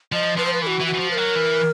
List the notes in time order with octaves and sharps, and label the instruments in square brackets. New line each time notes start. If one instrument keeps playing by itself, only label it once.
[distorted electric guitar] F3 [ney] D#5
[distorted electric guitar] F3 [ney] B4
[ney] C5
B4
[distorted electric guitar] E3 [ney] A#4
[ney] F#4
[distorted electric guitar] E3
[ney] F#4
[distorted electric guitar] E3
F3
[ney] B4
[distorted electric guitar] F#3 [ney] A#4
[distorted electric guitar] E3